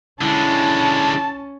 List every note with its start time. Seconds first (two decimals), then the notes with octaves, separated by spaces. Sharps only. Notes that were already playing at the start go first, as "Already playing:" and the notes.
0.21 D3 G#3 C#4 E4 A5